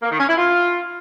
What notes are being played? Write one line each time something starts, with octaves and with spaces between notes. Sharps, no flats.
A#3
D#3
C#4
E4
F4